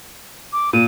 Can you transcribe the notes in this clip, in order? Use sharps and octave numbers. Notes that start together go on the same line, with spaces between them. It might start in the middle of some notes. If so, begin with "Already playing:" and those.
D6
A#2 D#7